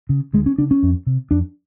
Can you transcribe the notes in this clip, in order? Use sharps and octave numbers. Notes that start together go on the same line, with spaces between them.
C#3
D2 G#3
C#4
C#3 D4
C#4
F2
C3
F2 D4